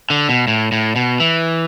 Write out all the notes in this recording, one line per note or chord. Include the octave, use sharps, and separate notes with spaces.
D3
B2
A2
A2
B2
E3